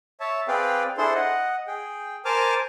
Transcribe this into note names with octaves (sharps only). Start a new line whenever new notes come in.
C#5 E5 A5
C4 G#4 B4 D5 F5 G5
D4 E4 G#4 A4 C5 C6
D#5 F#5
G#4 G5
A#4 C5 G#5 A5 D6 F6